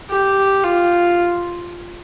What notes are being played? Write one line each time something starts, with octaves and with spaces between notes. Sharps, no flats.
G4
F4